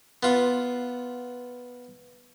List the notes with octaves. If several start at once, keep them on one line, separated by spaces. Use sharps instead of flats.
B3 F4